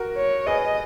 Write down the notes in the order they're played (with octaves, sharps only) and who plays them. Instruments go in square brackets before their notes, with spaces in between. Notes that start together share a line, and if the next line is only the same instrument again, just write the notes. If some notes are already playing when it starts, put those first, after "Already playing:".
Already playing: [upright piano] F#4 A#4
[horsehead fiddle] C#5
[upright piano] G#4 B4 [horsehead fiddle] D#5